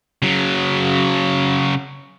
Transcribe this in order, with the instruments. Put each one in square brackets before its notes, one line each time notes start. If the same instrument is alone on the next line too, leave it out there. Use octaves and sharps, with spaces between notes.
[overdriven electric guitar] C#3 F#3